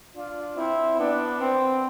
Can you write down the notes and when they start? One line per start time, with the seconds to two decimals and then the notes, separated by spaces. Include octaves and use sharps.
0.15 D4 F4
0.56 C4 E4
0.98 B3 D4
1.39 C4